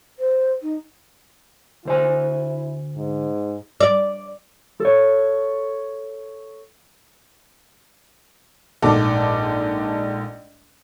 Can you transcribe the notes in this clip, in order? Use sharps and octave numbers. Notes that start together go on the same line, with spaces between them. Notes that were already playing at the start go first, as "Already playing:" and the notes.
C5
D#4
D2 E4 C5 G#5
G#2
D5
A4 C#5
A#1 G#2 A3 A4 D6